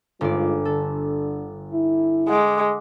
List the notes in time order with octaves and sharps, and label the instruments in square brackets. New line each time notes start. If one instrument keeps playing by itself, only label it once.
[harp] G1 D5 [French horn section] G#2 G#3 F4
[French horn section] D3 [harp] A4
[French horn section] E4
[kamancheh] G#3 [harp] F#5 D6